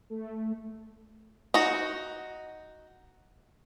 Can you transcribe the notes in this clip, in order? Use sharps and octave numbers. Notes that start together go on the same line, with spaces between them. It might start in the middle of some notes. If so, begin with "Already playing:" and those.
A3
D#4 F#4